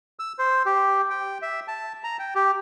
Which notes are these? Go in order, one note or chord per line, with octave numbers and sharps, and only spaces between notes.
E6
C5
G4
G5
E5
A5
A#5
G5
G4